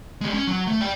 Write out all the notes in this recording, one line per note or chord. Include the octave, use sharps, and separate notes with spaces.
G3 G#3
C#4
F#3
A3
D5 G5